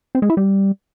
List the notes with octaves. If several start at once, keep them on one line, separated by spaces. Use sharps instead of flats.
C4
G#3
E4
G3